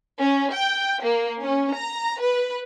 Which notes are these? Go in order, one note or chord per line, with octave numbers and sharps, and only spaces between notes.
C#4
G5
A#3
C#4
A#5
B4